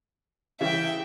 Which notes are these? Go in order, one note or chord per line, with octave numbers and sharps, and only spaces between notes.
C#3 E3 E5 G5